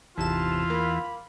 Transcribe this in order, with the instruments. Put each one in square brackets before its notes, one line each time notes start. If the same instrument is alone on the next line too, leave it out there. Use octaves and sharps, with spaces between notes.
[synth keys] G#1 C3 E7 [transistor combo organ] E2 E3 [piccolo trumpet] F4 [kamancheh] A5
[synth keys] A#3 [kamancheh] B5